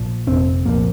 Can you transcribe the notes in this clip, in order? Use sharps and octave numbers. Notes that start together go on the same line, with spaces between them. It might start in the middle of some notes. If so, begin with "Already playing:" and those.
Already playing: A#1 A#2 F3
G1 F2 C3 C4
C2 A#2 F3 A#3